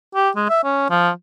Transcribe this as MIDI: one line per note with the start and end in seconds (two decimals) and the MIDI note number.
0.15 0.30 67
0.36 0.48 56
0.49 0.61 76
0.64 0.89 61
0.90 1.10 53